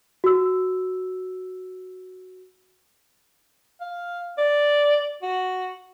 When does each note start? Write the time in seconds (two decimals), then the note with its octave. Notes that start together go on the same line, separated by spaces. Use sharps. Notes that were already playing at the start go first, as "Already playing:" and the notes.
0.24 F#4 E6
3.81 F5
4.38 D5
5.23 F#4